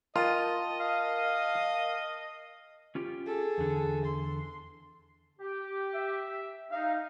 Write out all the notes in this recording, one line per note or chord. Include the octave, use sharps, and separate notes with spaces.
F4 A#4 D#5 G5 A5
F5
C#4 F4 G4
G#4 A4
E2 D3
C6
G4
E5
D#4 F5